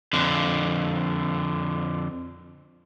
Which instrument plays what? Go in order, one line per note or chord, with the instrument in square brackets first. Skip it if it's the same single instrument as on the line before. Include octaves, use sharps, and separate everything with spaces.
[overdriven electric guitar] F2 D3